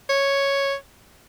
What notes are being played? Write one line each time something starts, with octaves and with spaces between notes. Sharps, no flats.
C#5